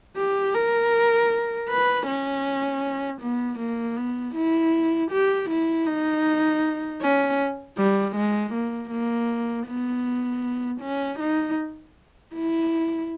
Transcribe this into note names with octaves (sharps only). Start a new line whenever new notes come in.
G4
A#4
B4
C#4
B3
A#3
B3
E4
G4
E4
D#4
C#4
G3
G#3
A#3
A#3
B3
C#4
D#4
E4